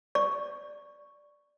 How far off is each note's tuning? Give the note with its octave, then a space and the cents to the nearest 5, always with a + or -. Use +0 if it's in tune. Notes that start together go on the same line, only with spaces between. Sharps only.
D5 +0 C#6 +0